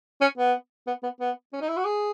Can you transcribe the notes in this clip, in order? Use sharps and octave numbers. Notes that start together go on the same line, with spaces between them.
C#4
B3
B3
B3
B3
C#4
D#4
E4
F#4
G#4